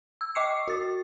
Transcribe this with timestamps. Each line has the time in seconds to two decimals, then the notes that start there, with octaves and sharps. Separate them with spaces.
0.21 E6
0.35 D#5 C#6 D6 C7 C#7
0.68 F#4 A6